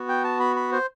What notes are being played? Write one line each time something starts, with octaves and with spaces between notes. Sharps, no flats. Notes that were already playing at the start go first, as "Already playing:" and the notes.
Already playing: B3 F#4
G5
A5
B5
B5
C5